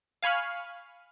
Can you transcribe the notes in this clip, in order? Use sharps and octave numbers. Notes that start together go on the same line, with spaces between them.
F5 G#5 B5 C#6 F6